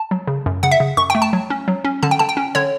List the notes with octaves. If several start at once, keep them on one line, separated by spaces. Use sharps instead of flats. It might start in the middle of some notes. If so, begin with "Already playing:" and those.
Already playing: A5
F#3
C#3
F#2
C#3 F#5
E5
C#3
F#2 C#6
A3 G5
A5
F#3
C#4
F#3
C#4
D3 A5
G5
D3 A5
G5
C#4
D3 C#5